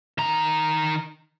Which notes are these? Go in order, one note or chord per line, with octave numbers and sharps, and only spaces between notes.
D#3 A#5